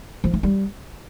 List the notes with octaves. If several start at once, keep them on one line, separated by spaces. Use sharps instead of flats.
F3
A3
G3